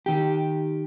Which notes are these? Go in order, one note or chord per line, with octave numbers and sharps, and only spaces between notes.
D#3 G4